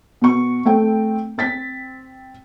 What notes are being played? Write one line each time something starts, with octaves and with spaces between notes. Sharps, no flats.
B2 C#6
A3 C4 G5
C4 A6 B6